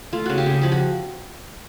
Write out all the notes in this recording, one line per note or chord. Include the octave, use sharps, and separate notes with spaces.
A3 F4
C#3 F#4
G4
C#3 G#4
F3 G4
F#4